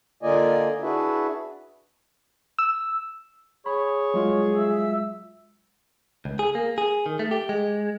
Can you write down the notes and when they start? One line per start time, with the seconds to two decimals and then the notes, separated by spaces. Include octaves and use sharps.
0.23 D3 A#3 F4 D5 D#5 G#5
0.82 D4 E4 F#4 G#4 B4 E5
2.59 E6
3.66 G#4 C#5 B5
4.14 F#3 G#3 F4
4.56 E5 E6
6.25 C#2
6.39 G#4
6.55 A#3
6.78 G#4
7.06 D#3
7.19 A3
7.31 G4
7.49 G#3